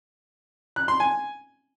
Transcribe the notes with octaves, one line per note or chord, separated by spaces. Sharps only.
F#6
C6
G#5